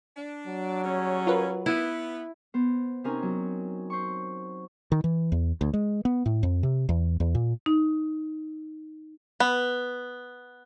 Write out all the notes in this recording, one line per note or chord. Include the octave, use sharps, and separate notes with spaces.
D4
F#3
C#3 G3 C#4
F4 A#4 B4
B3 E4
B3 C5
C3 C4 C#4 D#4 A#4 G#5
F#3
C5 C#6
D#3
E3
E2
D2
G#3
B3
A2
F2
C3
E2
E2
A#2
D#4
B3